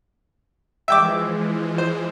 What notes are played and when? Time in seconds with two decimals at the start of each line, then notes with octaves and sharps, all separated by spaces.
0.88 E3 F3 G#3 E5 G5 D6
1.78 C5